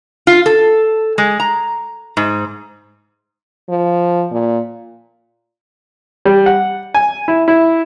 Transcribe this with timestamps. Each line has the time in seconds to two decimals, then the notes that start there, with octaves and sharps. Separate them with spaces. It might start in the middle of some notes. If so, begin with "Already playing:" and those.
0.27 F4
0.46 A4
1.18 G#3
1.40 A#5
2.17 G#2
3.69 F3
4.32 A#2
6.25 G3
6.46 F#5
6.94 G#5
7.28 E4
7.48 E4